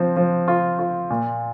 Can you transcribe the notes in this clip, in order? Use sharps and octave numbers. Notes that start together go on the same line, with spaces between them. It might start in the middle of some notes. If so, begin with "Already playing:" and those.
Already playing: F3 C4
F3
F4
F4
A#2